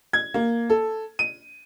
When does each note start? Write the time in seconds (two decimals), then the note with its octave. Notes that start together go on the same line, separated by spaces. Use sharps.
0.13 G#6
0.34 A#3
0.70 A4
1.19 D#7